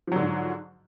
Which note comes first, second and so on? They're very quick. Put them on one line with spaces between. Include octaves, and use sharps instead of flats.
F3 F#3 D3 G#2